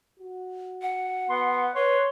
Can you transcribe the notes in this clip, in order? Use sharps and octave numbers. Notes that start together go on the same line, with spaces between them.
F#4
F#5
B3 C6
B4 C#5 C6